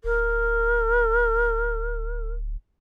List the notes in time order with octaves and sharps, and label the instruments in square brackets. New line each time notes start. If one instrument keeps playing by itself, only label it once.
[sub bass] D1 [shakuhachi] A#4